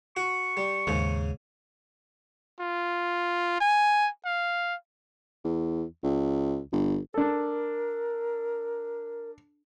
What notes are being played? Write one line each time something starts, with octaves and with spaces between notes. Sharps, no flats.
F#4 C#6
G3
D#2 G#2 C#3
F4
G#5
F5
E2
C#2
G1
D4 A4 A#4